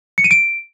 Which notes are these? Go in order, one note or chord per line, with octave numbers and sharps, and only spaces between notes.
C#7
D#7
D7